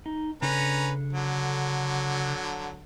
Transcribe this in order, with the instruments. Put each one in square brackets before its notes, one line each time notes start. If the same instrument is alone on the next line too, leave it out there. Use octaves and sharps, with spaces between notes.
[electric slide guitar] D#4
[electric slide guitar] C#3 D4 A4 [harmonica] C#4 B4 A#5
[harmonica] D3 F#3